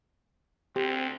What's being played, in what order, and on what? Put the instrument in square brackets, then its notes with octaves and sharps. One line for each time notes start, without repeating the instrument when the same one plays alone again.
[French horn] D2 [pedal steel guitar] C4 [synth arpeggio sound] G4